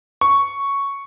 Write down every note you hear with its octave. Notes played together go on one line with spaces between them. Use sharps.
C#6